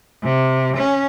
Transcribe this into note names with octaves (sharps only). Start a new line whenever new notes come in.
C3
C#4